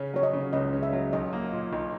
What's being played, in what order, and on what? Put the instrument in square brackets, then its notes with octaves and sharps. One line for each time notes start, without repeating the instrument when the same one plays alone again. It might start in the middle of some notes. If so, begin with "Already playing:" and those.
Already playing: [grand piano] C#3 C#4
[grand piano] F#3 [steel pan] C#5
[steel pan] D#5
[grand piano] C#3
[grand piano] C#2 [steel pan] D#5
[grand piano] C#4
[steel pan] E5
[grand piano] F#3
[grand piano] B1 [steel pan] D#5
[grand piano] A#3
A#2
B1